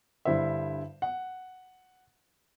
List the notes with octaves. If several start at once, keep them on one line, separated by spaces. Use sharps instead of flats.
G2 D3 E4 C5 E5
F#5